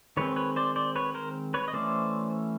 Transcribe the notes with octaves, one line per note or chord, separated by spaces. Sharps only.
D#3 G#3 C4 B4 C#5
B4 C#5
C5 D5
C5 D5
B4 C#5
A#4 C5
B4 C#5
D#5
E3 A3 C#4 C5 D5